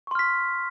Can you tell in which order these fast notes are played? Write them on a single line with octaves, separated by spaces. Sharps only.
C#6 C6 F6 B6